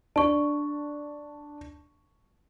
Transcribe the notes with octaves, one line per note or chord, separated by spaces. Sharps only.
D4 A5 C#6